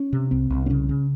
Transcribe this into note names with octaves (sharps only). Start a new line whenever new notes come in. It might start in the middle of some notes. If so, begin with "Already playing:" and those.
Already playing: C#4
C3
C2 C4
C2
C4
C#3 C#4
C#3